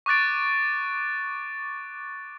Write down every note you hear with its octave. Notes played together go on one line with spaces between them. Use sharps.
C#6 D6 F#6 A6 D7